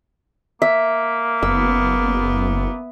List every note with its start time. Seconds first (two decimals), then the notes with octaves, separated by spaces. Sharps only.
0.62 A#3 E5
1.43 F#1 B3 E6